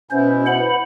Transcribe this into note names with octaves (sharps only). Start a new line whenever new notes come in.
B2 B3 C#4 E4 C5
C5 F#5 B5